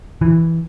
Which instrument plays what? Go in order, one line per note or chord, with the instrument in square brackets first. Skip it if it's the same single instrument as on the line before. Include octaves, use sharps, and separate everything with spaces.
[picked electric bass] E3